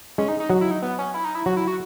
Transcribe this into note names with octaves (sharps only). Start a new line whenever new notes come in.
G#3 C#4
D#4
D#4
F#3 F#4
E4
D#4
B3
C#4
E4
D#4
E4
F#3 F#4
E4
F#4